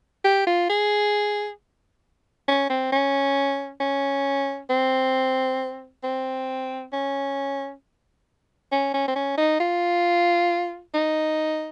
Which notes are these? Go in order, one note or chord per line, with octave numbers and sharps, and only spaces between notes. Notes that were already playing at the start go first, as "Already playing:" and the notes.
G4
F4
G#4
C#4
C4
C#4
C#4
C4
C4
C#4
C#4
C#4
C4
C#4
D#4
F4
D#4